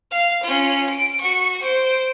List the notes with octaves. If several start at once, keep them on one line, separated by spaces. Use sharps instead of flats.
F5
C#4 F4
D7
F#4 C#6
C5 D7